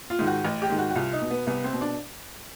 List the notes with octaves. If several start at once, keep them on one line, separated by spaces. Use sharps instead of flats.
F4
G#2 D#3
F#4
A1
G4
G#2 D#3
F#4
F#4
C2 F4
D#4
B2
B3
C2 B3
C4
B2
D4